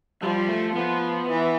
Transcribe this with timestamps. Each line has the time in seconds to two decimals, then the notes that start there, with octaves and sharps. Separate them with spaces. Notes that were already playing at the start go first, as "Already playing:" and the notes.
0.22 F3 G3
0.49 A3
0.76 F3 B3
1.29 E3